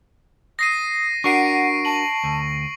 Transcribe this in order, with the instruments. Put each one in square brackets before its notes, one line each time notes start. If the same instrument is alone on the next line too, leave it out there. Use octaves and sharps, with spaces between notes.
[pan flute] D#6 [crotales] A#6 C7 D#7
[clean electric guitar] D4 F#4 A#4 [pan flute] F#5 [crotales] C#6 C7 D7
[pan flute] A5 [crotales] F#7
[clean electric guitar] D2